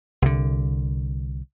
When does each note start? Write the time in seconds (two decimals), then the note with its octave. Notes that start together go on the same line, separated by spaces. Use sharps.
0.22 C2 D3